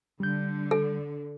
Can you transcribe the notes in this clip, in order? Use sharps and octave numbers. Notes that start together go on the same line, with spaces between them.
D3 G3 G6
A4